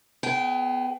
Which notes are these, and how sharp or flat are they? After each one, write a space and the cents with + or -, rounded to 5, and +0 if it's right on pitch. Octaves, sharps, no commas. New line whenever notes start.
B3 +20 G#4 +30 G5 -15